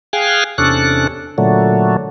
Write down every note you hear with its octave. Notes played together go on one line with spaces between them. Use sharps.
G#4 F5 G5 G#5 F6 F#6
E2 C3 C#4 D4 A4 F#6
A#2 D3 F#3 A3